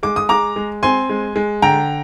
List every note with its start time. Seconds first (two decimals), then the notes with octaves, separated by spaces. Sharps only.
0.03 G#3 D6
0.16 D#6
0.29 G#3 A#5 D6
0.56 G#3
0.83 C4 G#5 C6
1.10 G#3
1.36 G#3
1.62 D3 G5 A#5